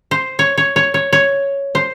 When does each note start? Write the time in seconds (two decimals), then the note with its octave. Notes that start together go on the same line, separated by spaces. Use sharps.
0.11 C5
0.39 C#5
0.58 C#5
0.76 C#5
0.94 C#5
1.13 C#5
1.75 C5